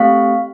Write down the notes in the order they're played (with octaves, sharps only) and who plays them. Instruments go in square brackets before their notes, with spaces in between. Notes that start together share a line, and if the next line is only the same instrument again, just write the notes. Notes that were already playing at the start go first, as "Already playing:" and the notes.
Already playing: [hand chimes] A3 C4 G4 F5